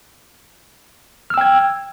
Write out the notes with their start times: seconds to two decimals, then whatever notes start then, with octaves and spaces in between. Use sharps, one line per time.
1.30 F6
1.34 E6
1.38 G5
1.41 G#6